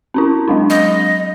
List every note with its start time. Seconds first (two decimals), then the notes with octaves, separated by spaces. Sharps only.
0.14 C4 C#4 E4
0.48 F#3 G#3 D4
0.70 D#5